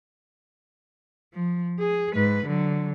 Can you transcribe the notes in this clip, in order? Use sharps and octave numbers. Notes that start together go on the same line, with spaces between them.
F3
G#4
G#2 B4
D3 F#3